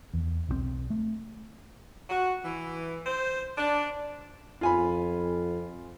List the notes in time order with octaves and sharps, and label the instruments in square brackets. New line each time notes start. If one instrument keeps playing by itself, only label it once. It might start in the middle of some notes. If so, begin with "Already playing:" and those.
[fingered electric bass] E2
B1 F3 C4
A3
[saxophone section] F#4
E3
C5
D4
[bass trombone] F2 [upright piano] F4 G#5 B5